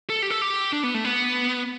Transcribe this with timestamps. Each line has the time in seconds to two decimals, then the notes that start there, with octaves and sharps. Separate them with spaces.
0.10 A4
0.22 G4
0.30 A4
0.42 G4
0.73 D4
0.83 B3
0.94 A3
1.05 B3